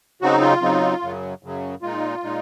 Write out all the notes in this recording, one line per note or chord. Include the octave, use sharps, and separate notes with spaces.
C#3 F#3 C4 D#4 F#4
F4
C#3 F#3 C4 D#4
F#2 C#3 F#3
F#2 C#3 F#3
A#2 G#3 D#4 F4
A#2 G#3 D#4